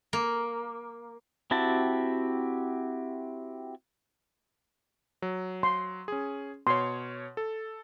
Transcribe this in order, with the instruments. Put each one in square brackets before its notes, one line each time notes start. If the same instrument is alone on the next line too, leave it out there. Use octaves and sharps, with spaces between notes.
[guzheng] A#3
[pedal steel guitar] C4 E4 F#4 G4 A5
[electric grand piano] F#3
[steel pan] C6
[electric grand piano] C#4 G#4
[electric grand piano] B2 C#5 [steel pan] C6
[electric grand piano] A4